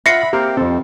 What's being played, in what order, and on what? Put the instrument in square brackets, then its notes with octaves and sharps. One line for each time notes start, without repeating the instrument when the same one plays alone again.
[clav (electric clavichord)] F4 F#5 [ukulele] E5 [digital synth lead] B5 [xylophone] A#6 C7 C#7
[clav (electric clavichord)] A#3 C4 A#4 [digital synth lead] G4
[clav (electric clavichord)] F2 A4 [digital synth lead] C4